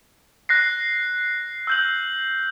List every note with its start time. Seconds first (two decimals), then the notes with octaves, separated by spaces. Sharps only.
0.49 F#6 A#6 C7
1.67 E6 G6 F#7